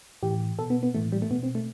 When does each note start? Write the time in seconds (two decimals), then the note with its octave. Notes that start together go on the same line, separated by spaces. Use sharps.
0.23 A2 E3 G4
0.58 B2 A4
0.70 B3
0.83 B3
0.94 A2 E3 A3
1.12 G3
1.22 A3
1.31 B2 B3
1.43 C4
1.55 A3